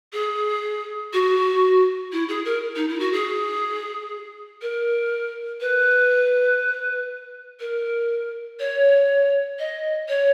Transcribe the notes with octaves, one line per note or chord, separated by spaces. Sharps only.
G#4
F#4
E4
G#4
A#4
D#4
E4
F#4
G#4
A#4
B4
A#4
C#5
D#5
C#5